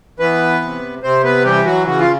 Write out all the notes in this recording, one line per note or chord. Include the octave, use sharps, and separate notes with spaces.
E3 B3 B4
C3
C3 C4 C5
B3 B4
E3 G3 G4
F#3 F#4
C#3 F#4
F4